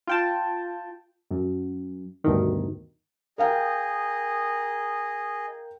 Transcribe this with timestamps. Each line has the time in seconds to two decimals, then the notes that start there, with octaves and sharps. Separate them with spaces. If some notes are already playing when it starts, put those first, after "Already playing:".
0.07 F4 G5 A5
1.31 F#2
2.24 D2 G2 B2 D#3
3.38 G#4 A#4 D#5 F5 G5